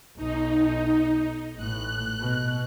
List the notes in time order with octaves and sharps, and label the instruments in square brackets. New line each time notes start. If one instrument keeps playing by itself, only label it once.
[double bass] B1 [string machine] D#4
[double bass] A1 A2 [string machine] F#6
[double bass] B2